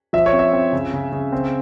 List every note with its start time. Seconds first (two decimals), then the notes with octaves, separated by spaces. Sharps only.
0.13 F3 E5
0.26 C#5
0.33 C4
0.39 E5
0.53 C4
0.73 C#3
0.93 C#3
1.12 C#3
1.32 C4